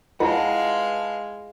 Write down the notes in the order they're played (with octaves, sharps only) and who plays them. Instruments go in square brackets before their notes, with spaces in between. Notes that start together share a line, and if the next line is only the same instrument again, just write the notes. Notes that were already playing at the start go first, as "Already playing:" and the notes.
[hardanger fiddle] G#3 F5 [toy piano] E4 F4 [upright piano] B4 A5 [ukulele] F#5